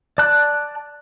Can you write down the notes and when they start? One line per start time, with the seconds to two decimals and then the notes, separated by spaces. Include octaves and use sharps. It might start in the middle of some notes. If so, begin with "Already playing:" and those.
0.18 D5 A5 F#6